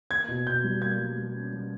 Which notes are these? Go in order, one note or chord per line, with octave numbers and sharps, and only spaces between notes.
A#3 G#6
B2
B2 G6
G3
A#3 G#6
G3
G3
C#4
G3